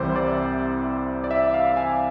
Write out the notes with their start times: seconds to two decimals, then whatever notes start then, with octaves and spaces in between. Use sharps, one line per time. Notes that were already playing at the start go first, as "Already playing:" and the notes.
Already playing: C2 C3 E3 C5 D5
0.16 D5
1.24 D5
1.31 E5
1.54 F5
1.77 G#5